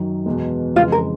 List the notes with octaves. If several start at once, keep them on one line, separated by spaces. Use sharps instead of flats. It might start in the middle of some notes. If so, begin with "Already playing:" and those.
Already playing: F#2 D#3 F#3
E2 B2 G#3
F2 C#3 E3 G#3 B3 F4
A#4